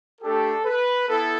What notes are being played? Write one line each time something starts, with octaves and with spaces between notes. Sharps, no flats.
A3 D4 G4 A4
B4
B3 E4 A4